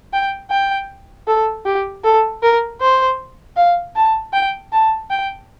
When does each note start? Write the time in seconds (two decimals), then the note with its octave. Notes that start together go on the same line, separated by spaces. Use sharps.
0.13 G5
0.51 G5
1.28 A4
1.66 G4
2.04 A4
2.43 A#4
2.81 C5
3.57 F5
3.96 A5
4.33 G5
4.72 A5
5.10 G5